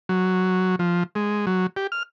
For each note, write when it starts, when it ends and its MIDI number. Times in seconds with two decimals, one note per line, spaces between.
0.09 0.76 54
0.79 1.03 53
1.15 1.46 56
1.47 1.67 54
1.77 1.87 67
1.92 2.03 89